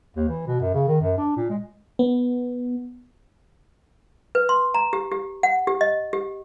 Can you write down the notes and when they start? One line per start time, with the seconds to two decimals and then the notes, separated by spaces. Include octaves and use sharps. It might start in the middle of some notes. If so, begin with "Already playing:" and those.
0.16 D#2
0.29 E3
0.47 B2
0.61 F#2
0.74 C#3
0.88 D#3
1.01 F#2
1.18 D4
1.37 A#2
1.49 G#3
1.99 B3
4.35 B4
4.49 C6
4.74 A#5
4.93 G4
5.12 G4
5.43 F#5
5.67 G4
5.81 D#5
6.13 G4